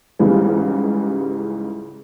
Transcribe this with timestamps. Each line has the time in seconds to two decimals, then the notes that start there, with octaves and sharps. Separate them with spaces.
0.19 C#2 G#2 C#3 E3 G3